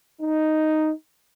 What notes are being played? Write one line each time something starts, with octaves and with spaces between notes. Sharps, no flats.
D#4